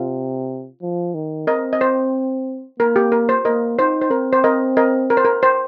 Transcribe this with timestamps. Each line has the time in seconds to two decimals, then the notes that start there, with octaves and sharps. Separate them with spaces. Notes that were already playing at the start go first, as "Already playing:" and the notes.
Already playing: C3 F4
0.82 F3
1.14 D#3
1.47 C4 A#4 D#5
1.73 D#5
1.81 C5
2.79 A#3 A#4
2.96 G4
3.12 A#4
3.29 C5
3.45 A#3 A#4 D#5
3.78 D#4 C5
4.02 C5
4.10 C4 A#4
4.33 C5
4.44 A#4 D#5
4.77 A#4 D#5
5.10 A#4
5.17 C5
5.25 A#4
5.43 C5